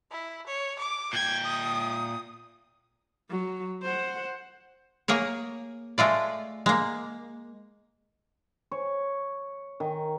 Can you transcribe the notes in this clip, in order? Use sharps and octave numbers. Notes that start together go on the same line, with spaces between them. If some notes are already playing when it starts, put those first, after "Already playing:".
E4
C#5
D6
A#2 G5 G#6
D#6
F#3
C5 F#5
A#3 G#4 A#4 C#5
G#3 A3 F4 D5
G#3 A#3
C#5
D#3